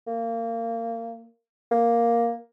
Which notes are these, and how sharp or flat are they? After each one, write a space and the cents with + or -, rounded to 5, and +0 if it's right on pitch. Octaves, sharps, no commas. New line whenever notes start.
A#3 -25
A#3 +5